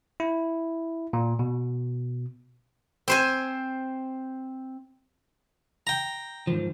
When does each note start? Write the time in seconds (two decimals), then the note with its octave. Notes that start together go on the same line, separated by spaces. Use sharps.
0.20 E4
1.13 A#2
1.39 B2
3.08 C4 C5 G#5
5.87 G5 A#5
6.47 G#2 D#3 F3